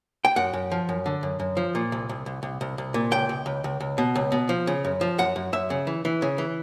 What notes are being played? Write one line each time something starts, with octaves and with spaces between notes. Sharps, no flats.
G5
F#2 F#5
F#2
F3
F#2
D3
F#2
F#2
F3
A#2
C2
C2
C2
C2
C2
C2
A#2
C#2 G5
C#2
C#2
C#2
C#2
B2
C#2
B2
F3
C#3
F#2
F3
F#2 F#5
F#2
F#2 E5
C#3
E3
E3
C#3
E3